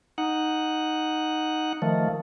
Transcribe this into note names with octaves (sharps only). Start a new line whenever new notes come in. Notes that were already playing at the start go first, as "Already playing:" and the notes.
D#4 F#5
D#3 F3 A3